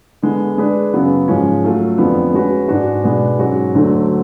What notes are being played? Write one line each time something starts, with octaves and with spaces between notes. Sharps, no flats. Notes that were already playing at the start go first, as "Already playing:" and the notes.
D3 G#3 B3
G#3 D4 G#4 B4
F#2 C#3 F#3 B3
G#2 F3 G#3 C#4
F#3 A3 F4 A4
F2 D3 F3 B3 D4
G#3 C#4 F#4 B4
G#2 G#3 D4 F#4
B2 G#3 B3 D4
G#2 F#3 C#4 F#4
D2 D3 F#3 A3